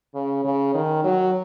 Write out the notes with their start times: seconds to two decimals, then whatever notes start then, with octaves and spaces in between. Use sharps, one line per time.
0.15 C#3
0.44 C#3
0.74 D#3
1.04 F#3